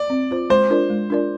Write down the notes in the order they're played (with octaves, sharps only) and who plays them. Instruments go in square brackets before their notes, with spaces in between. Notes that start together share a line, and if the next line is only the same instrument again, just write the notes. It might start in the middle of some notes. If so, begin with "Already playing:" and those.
Already playing: [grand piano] D5
[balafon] C4
F4 C5
[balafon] G#3 [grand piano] C5
[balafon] D4 F4 A#4 D5
G#3
D4 F4 A#4 D5